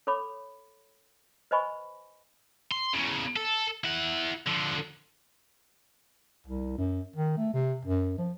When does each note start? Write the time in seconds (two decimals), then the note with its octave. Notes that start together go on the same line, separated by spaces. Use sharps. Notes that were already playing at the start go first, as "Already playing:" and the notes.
0.07 A4 C#5 B5 D6
1.51 B4 C5 D#5 G#5 B5 C#6
2.71 C6
2.93 E2 C#3
3.36 A4
3.84 E4 F#5
4.47 D3 F3
6.47 C2
6.78 F#2
7.16 D#3
7.37 A3
7.54 C3
7.85 F#2
8.18 F3